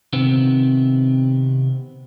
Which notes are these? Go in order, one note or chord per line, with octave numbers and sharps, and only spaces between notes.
C3 D#3 B3 C4